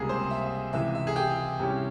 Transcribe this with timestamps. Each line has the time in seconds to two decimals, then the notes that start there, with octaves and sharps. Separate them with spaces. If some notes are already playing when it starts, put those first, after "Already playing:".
Already playing: C#2 C3 G3 A#3 G#4
0.09 C5
0.30 E5
0.73 C#2 C3 E3 E5
0.95 E5
1.07 G#4
1.16 G4
1.60 C3 G3 C#4 E4